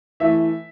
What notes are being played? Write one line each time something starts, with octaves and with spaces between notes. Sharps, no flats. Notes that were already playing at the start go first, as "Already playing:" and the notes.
E3 A3 E5